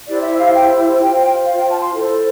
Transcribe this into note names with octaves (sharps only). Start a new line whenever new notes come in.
E4 G4 C5 D5
E5
F5
G5
F4 C5 G5
F5
G5
A5
C6
E4 A4 C5